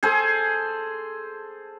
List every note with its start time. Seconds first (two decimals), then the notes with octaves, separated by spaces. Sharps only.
0.03 G#4 A4 C5